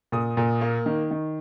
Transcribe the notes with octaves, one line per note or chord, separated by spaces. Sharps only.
A#2 D#6
A#2
A#3
D#3
D#3